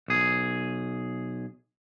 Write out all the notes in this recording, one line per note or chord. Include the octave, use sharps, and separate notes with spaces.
B1 G#4